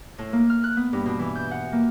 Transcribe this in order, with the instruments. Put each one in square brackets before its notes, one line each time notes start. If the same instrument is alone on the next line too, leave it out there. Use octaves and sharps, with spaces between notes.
[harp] A2
A#3
F6
F#6
B3
G2
B2
E3
G6
F#5
A#3